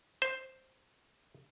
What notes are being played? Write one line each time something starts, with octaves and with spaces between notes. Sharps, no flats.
C5